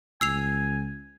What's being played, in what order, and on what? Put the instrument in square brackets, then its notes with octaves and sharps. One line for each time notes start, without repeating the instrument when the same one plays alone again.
[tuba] C#2 [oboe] G#5 [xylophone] E6 C7 F7